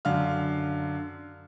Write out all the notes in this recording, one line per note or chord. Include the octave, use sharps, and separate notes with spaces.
F#2 D3 F5 F6